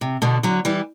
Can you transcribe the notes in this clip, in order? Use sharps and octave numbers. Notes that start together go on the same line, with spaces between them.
C3
B2 D3
D3 F#3
E3 G3